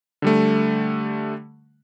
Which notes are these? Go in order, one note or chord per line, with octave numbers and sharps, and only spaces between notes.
D3 G3 A3